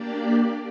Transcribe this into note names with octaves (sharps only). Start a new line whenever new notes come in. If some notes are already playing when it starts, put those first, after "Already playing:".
Already playing: A#3 D4 G4 D5